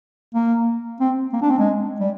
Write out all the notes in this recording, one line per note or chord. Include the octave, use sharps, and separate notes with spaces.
A#3
C4
A#3
D4
C4
G#3
G3